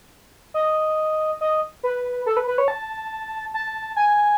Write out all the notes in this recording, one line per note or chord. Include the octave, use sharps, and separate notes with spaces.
D#5
D#5
B4
A4
B4
B4
C#5
A5
A5
G#5